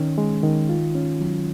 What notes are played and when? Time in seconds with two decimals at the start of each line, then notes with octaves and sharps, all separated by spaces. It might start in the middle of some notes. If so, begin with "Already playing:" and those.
Already playing: D#3 C#4
0.18 G#3
0.43 D#3
0.69 F4
0.95 C#4
1.20 F#3